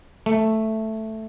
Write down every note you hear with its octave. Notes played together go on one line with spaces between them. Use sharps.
A3